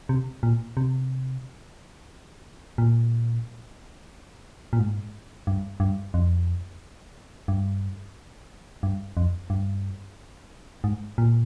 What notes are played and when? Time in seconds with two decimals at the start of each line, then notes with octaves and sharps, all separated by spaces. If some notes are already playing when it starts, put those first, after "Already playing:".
0.09 C3
0.43 A#2
0.77 C3
2.78 A#2
4.73 A#2
4.79 G#2
5.47 G2
5.80 G2
6.14 F2
7.48 G2
8.83 G2
9.17 F2
9.50 G2
10.84 G#2
11.18 A#2